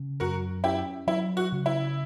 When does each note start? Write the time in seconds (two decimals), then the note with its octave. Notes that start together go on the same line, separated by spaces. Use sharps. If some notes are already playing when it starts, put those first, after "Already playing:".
Already playing: C#3
0.20 F#2 F#4 A#4
0.64 C#4 E4 G4
1.07 F#3 E4
1.37 F#4
1.52 C#3
1.66 E4